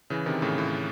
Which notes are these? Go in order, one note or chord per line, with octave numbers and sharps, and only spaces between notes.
C#3 E3
C3 D#3
A2 C#3
A2